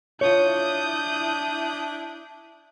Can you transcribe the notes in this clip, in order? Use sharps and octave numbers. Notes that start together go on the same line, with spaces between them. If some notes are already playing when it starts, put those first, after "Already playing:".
D4 E4 F4 C#5 D#6 G6